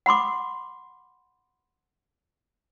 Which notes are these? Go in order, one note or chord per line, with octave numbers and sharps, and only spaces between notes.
F#5 B5 C6 D6